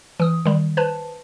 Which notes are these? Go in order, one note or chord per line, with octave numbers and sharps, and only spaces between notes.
E3 D#6
D#3 G3
B4 C5 A5